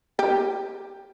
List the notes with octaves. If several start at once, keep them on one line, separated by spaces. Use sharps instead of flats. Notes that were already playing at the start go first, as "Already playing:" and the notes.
G4